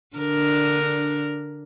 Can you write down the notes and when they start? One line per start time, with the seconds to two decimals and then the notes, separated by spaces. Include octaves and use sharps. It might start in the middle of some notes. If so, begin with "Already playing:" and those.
0.16 D3 D4 A#4